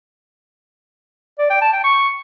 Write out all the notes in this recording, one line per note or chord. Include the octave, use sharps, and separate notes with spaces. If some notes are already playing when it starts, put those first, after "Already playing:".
D5
G5
A5
G5
C#6